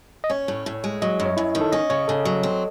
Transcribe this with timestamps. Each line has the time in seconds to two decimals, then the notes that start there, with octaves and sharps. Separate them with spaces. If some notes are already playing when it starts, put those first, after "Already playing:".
0.24 D#5
0.30 C#4 C#5
0.48 A2
0.66 A2
0.84 G#3
1.02 F#3 D#5
1.20 F#2
1.26 C#5
1.37 F#2 E4
1.55 D#3
1.61 A4
1.72 C#4 D#5
1.90 C#3 C#5
2.08 C#3 A4
2.25 F#3
2.43 C4